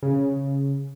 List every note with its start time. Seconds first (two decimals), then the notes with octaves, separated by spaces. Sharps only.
0.02 C#3